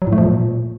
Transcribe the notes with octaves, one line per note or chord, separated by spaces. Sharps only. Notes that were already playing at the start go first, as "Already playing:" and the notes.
F#3
A2
A3
F3
A#2